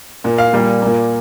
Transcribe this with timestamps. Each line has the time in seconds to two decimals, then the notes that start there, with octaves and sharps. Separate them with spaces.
0.24 A#2 A#3
0.38 F5
0.53 A#2 G3 A#3
0.82 A#2 A#3